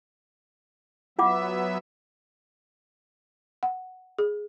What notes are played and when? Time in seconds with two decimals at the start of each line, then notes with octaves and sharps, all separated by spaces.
1.19 F#3 B3 F4 E5 F#5 D6
3.63 F#5
4.18 G#4